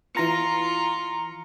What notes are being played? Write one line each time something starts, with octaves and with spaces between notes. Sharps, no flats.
E3 F4 A#5 C#7